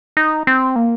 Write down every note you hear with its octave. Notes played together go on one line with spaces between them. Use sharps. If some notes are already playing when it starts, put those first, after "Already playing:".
D#4
C4
A#3